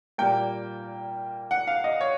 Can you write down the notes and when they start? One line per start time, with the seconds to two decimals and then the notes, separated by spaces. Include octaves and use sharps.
0.18 A#2 G3 A#3 G5
1.51 F#5
1.67 F5
1.84 D#5
2.01 C#5